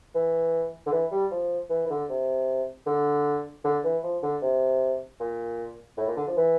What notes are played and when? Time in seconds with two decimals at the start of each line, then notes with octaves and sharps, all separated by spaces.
0.15 E3
0.87 D3
0.92 E3
1.11 G3
1.31 F3
1.70 E3
1.86 E3
1.90 D3
2.09 C3
2.86 D3
3.64 D3
3.84 E3
4.03 F3
4.23 D3
4.42 C3
5.20 A#2
5.97 A2
6.08 A#2
6.17 D3
6.27 F3
6.37 E3